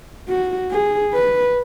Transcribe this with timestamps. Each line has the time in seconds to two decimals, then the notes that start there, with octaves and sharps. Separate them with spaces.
0.29 F#4
0.72 G#4
1.14 B4